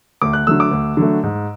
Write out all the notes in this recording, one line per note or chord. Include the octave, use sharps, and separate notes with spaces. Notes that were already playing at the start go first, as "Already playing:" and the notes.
D2 D6
F#6
D3 F#3 A3 E6
D6
D2
D3 F#3 A3
G#2